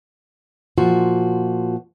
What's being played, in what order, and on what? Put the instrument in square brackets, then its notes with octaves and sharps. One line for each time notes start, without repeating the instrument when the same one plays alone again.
[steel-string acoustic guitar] A#2 F3 F#4